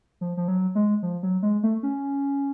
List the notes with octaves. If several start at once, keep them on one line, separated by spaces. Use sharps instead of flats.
F3
F3
F#3
G#3
F3
F#3
G#3
A3
C#4